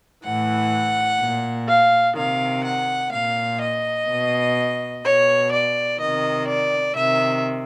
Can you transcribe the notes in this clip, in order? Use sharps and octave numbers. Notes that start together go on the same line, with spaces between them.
A2 E3 F#5
A#2
F5
C3 D#3 F5
F#5
A#2 F5
D#5
B2
B2 C#5
D5
C3 D#3 D#5
D5
C3 D#3 E5